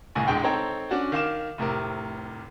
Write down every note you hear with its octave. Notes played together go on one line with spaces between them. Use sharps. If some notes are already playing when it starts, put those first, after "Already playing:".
G1 C2 A2 G#5
E1 D3 G#3 G5
C4 D#4 A4 C#5 G5 A#5
C#4 D4 F#4
D#3 F5 D6 E7
F1 A2 C3 A#4